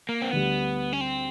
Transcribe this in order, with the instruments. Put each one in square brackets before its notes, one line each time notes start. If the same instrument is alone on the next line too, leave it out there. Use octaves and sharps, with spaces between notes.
[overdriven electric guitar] A#3
C4
[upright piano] D2 D3 G3 [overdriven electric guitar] B3
[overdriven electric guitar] C#4
C4